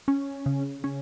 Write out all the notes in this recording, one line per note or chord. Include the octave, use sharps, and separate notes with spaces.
C#4
C#3
C#4